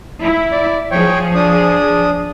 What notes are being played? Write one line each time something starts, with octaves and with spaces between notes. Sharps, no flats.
E4
D5
F3 G#4 C#5 G5
D4 D#6